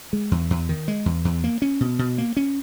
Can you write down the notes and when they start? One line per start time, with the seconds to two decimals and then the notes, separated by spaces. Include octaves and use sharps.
0.13 G#3
0.31 E2
0.50 E2
0.69 D#3
0.88 G#3
1.06 E2
1.25 E2
1.44 A#3
1.62 C#4
1.80 B2
1.99 B2
2.18 A#3
2.37 C#4